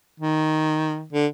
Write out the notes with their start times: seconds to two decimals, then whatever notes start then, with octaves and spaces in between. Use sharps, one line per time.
0.20 D#3
1.13 D3